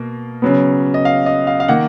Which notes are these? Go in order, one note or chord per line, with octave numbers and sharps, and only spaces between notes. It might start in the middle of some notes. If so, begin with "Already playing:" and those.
Already playing: B2 A#3
C#3 F#3 B3
D#5
F5
D#5
F5
F5
D#3 A#3 F#5